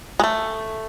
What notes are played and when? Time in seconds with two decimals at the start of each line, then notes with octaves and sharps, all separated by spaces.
0.20 G#3
0.24 A3